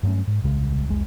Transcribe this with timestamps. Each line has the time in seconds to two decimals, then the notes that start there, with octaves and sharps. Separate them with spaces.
0.03 G2 F#3 A3 C#4
0.27 G#2
0.42 D#1 C2 C#3 G#3
0.88 F1 C2 G#3